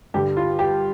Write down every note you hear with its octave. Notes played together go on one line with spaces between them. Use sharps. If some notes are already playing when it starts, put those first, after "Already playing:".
G2 D3 G3 G4
F4
G4